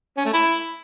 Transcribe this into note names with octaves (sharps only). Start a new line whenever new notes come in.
C#4
A3
E4